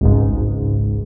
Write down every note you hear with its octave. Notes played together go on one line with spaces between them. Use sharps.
G#1 C#2 G#2